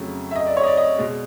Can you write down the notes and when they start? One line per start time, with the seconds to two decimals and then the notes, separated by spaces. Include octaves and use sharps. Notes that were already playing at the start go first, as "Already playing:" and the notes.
Already playing: F2 C#3 F#3 A3
0.31 E5
0.36 D#5
0.46 D5
0.57 C#5
0.63 D#5
0.67 D5
0.77 D#5
0.98 B2 G#3